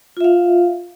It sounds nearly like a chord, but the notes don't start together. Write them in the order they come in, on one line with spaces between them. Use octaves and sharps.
F4 E5 F5